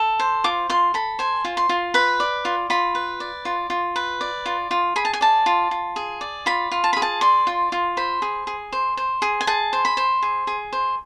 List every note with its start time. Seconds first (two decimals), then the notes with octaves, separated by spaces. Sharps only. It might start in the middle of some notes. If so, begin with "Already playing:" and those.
Already playing: A4
0.19 C5
0.44 F4 D6
0.70 F4 C6
0.94 A4 B5
1.19 C5 G#5
1.45 F4
1.57 C6
1.69 F4
1.94 B4 B5
2.20 D5
2.45 F4
2.70 F4 B5
2.95 B4
3.20 D5
3.45 F4
3.70 F4
3.96 B4
4.21 D5
4.46 F4
4.71 F4
4.96 G#4 B5
5.05 A5
5.13 G#5
5.21 D5 A5
5.46 F4
5.71 F4
5.96 G#4
6.21 D5
6.46 F4 B5
6.72 F4
6.84 A5
6.93 G#4 B5
7.02 A5
7.21 D5 C6
7.47 F4
7.72 F4
7.97 C5 B5
8.22 G#4
8.47 G#4
8.72 C5
8.97 C5
9.22 G#4
9.41 G#5
9.47 G#4 A5
9.73 C5
9.85 B5
9.97 C5
10.23 G#4
10.47 G#4
10.73 C5